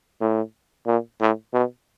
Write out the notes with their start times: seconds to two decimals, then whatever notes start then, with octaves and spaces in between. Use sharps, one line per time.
0.21 A2
0.87 A#2
1.21 A2
1.53 B2